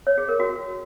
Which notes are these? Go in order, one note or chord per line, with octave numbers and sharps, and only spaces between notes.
C#5
G#4
A#4
F#4